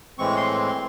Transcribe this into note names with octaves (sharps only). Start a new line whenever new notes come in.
A2 E3 G#3 C4 C#6
C6